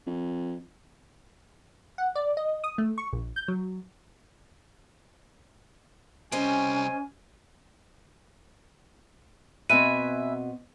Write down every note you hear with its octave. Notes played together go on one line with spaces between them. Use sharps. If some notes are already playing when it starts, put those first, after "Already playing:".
F2
F#5
D5
D#5
D#6
A3
C#6
A#1
G6
F#3
C3 G3 C#4 C5 D#5 G#5
B2 C4 B4 E5 G#5 D#7